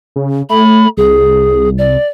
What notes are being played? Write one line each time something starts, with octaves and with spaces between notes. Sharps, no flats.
C#3
A3 B5
C2 G#4
D5